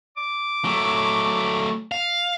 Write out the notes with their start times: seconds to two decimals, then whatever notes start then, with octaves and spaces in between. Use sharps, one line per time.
0.17 D6
0.65 F#3 A3
1.92 F5